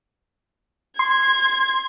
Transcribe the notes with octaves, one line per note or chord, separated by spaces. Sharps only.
C6 G#6